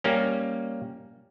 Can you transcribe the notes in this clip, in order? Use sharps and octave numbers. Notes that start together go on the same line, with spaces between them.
G3 A#3 C#4